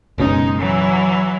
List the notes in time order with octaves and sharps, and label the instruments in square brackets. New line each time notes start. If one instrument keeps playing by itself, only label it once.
[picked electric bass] F#1 B2 C#4 [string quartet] G#3 D#4
[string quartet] E3 F#3